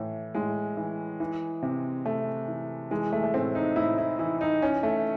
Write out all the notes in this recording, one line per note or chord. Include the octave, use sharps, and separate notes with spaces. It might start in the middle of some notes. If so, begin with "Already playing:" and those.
Already playing: A2 E3
A2 G#3
E3
E3
C3
C3 A3
E3
E3 G#3
A3
A3
A2 C4
D#4
A2 E4
E4
E3 E4
D#4
E3 C#4
A3